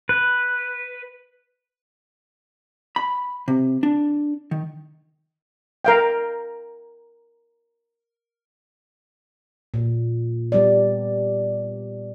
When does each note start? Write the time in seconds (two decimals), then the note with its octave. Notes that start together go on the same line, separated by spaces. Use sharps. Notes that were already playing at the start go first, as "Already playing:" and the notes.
0.09 B4
2.96 B5
3.48 C3
3.83 D4
4.51 D#3
5.85 A#4 F5 G5
9.74 A#2
10.52 G3 B3 D5